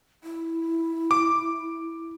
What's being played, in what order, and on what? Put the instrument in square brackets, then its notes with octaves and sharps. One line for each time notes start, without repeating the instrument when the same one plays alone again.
[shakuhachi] E4
[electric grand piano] D6